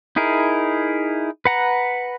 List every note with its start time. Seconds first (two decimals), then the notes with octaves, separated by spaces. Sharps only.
0.16 D#4 E4 G#4 A#4
1.45 B4 F#5 A#5